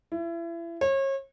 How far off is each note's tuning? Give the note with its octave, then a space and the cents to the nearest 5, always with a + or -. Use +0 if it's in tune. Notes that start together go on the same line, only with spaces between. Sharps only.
E4 +35
C#5 -35